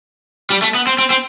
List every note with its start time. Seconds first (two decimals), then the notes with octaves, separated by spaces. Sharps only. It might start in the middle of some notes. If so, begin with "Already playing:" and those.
0.50 G3
0.62 A3
0.75 B3
0.87 C4
0.99 C4
1.10 C4